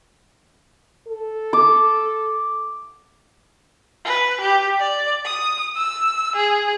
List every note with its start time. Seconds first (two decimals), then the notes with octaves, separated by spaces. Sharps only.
1.08 A4
1.53 D6
4.05 B4
4.41 G4
4.79 D5
5.25 D#6
5.75 E6
6.35 G#4